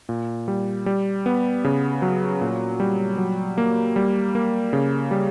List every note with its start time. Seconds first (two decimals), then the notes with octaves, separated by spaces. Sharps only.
0.09 A#2
0.48 G3
0.86 G3
1.26 B3
1.64 C#3
2.02 F#3
2.41 A#2
2.80 G3
3.18 F#3
3.58 A#3
3.96 G3
4.35 A#3
4.73 C#3
5.11 G3